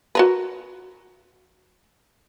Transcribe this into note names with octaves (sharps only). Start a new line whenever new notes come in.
F#4 A#4 B4